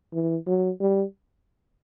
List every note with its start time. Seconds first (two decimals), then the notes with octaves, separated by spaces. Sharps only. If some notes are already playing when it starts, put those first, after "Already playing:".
0.13 E3
0.47 F#3
0.80 G3